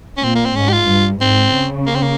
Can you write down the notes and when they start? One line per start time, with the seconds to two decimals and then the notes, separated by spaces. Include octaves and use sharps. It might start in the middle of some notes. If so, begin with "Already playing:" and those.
0.17 C#4
0.23 A#2 C4
0.35 A#3
0.45 C4
0.56 G#2 C#4
0.69 G4
0.73 F4
0.89 G2
1.20 G#2 C4
1.53 C#3
1.86 A#3
1.95 C4
2.02 A#3